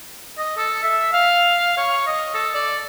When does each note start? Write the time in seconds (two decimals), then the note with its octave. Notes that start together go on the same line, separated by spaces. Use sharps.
0.38 D#5
0.58 A4
0.83 E5
1.13 F5
1.77 C#5
2.07 D#5
2.34 A4
2.54 D5